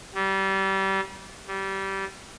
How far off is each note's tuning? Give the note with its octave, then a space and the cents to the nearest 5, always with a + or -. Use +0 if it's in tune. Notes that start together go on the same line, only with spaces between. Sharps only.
G3 -25
G3 -20